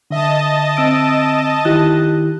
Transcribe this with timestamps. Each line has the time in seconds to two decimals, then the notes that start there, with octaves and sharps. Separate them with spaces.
0.11 D3 D#5 E5 A5
0.77 C4 E6 D7
1.65 D#3 E4 G4 F#6